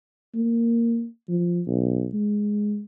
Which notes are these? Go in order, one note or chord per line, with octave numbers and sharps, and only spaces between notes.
A#3
F3
B1
G#3